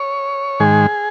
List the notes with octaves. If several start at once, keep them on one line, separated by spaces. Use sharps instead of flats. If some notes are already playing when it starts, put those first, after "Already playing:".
Already playing: C#5
G#2 D#3 G#3 G#4